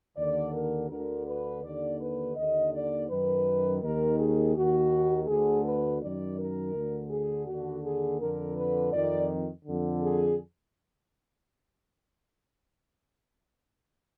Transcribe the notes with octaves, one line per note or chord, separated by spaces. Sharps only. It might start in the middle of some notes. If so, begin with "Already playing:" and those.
D#2 D3 D5
A#4
D2 D3 A#4
B4
D#2 D3 D5
B4
D#2 D3 D#5
D5
F#2 D#3 B4
D#2 D#3 A#4
G#4
D#2 D#3 F#4
D2 D3 G#4
B4
F#2 D#3 D5
A#4
D2 D3
G#4
D#2 F#4
D3
G#4
F2 D3 A#4
B4
F2 D#3 D5
F2 D3
G#4